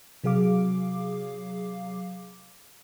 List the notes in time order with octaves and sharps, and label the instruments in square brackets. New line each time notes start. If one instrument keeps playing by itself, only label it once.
[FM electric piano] C3 F#3 G#4 F5 D6